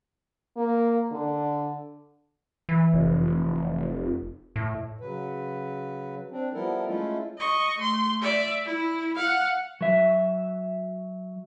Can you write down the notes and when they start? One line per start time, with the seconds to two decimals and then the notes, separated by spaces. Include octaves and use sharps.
0.57 A#3
1.12 D3
2.69 E3
2.93 F1
4.56 A2
5.01 C#3 F#3 B4
6.31 C4 D4
6.53 F3 G3 B3 E4 A4 A#4
6.86 G#3 A3 C#4 E4 F4 A4
7.38 D#5 C#6
7.78 A3 C6
8.22 D5 E5
8.66 E4
9.15 F5 F#5
9.81 F#3 E5